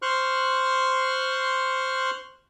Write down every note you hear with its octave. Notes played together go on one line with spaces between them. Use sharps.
C5 C6 C#6 F6 F#6